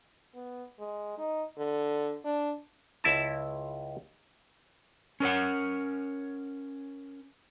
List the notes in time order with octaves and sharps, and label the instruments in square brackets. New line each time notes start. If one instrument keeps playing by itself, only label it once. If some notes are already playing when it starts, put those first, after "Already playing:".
[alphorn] B3
G#3
D#4
D3
D4
[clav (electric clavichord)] C#2 E4 A5
[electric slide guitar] C#4 A#4 C#5 F#5